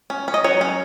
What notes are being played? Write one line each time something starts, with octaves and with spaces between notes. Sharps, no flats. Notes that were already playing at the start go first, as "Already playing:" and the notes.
C#4
C#4
D#5
F#3 C#5
C#4